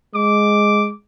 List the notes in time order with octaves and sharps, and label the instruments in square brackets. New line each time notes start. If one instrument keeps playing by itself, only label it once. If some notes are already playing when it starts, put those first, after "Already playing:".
[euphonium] G#3 [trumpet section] D6